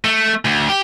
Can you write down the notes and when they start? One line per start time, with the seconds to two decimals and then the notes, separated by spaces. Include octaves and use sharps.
0.05 A3
0.45 D2
0.69 G4